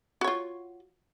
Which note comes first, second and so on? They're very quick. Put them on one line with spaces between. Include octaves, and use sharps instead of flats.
F#4 C#5 F4